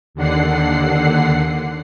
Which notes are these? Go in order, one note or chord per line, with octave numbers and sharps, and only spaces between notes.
D#2 D3 F#5 C7